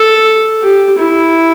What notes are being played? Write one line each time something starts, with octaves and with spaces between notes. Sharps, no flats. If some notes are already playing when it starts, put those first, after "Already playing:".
Already playing: A4
G4
E4